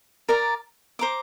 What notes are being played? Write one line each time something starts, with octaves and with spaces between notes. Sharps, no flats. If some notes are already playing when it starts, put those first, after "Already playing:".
A#4 D5 A#5
C5 A#5 D6